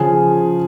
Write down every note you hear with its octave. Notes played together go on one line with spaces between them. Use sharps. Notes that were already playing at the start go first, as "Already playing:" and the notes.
Already playing: C#3 F3 G#4